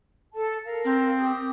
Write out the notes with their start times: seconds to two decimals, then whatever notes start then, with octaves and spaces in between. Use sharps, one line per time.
0.33 A4 A5
0.65 A#4 F5
0.85 C4
1.19 G4 D#6